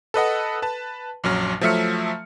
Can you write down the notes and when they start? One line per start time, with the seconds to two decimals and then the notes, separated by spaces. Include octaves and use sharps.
0.14 A4 B4 D#5 F#5
0.62 B4 A5
1.24 A#1 F#2 F#3 F6
1.61 F3 F#3 A3 E5 F6 C#7